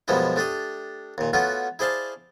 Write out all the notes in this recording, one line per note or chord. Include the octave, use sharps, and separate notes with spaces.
F#2 B2 F3 G3 G#3 E4
A3 D4 G4 D#6
D#2 A#2
A3 B3 C#4 F4 F#4
E4 G#4 C5 D5 F5 A5